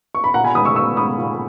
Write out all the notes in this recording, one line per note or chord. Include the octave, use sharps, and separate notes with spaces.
C#6
B5
A#2 F#5 A#5
G#5 B5
G#3 B5 D#6
C#6 E6
A#2 C#6 E6
G#3 B5 D#6
A#2